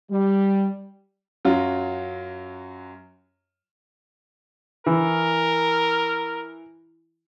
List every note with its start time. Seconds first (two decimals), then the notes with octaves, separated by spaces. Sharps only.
0.10 G3
1.45 F#2 F#3 F4
4.86 E3 A#4